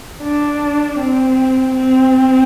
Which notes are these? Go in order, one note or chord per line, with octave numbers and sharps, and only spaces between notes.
D4
C4
C4